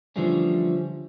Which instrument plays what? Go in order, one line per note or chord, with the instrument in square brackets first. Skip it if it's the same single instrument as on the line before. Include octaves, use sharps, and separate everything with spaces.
[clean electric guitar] D3 E3 F3 G3 A3 C#4